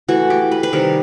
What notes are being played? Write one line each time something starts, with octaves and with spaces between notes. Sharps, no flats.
E3 A3 F#4
G4
B4
B4
C3 D#3 G3 A#4